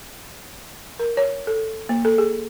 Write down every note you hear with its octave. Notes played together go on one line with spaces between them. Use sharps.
A#4
C#5
A4
A#3
A4
G#4